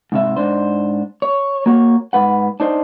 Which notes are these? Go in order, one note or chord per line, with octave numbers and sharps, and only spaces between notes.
G#2 C3 E5
G#2 D4 C5
C#5
A#3 F#4 C#5
G#2 B4 F#5
D4 D#4 C5